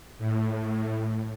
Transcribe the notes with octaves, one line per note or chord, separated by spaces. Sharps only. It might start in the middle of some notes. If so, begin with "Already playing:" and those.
A2